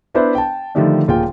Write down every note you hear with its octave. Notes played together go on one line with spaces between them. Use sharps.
B3 D4 E4 B4 C5 E5
G5 A5
D3 D#3 F3 G3 A3 D4
D#1 A#2 F4 G#4 G5